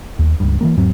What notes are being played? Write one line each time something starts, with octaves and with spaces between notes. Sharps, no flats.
D#2
C#2 G2
E3 G3 A#3
E2 G#2 F#3 C4